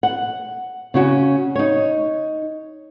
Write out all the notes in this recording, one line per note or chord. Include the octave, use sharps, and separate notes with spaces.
F#5
C#3 C#4 F#4
D#4 C#5